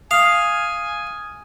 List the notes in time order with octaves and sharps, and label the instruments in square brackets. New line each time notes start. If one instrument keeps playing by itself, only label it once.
[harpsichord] F5 [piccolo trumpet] G#5 [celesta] D#6 F6